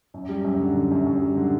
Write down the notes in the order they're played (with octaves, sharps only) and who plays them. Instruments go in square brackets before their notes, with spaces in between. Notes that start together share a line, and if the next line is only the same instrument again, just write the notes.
[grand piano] F#2
G3
F#2
D3
F#2
F#2
F#2
G3
D3